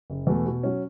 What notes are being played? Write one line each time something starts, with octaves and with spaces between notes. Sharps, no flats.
F#1
E2 B2 A3
B2
F#3 C#4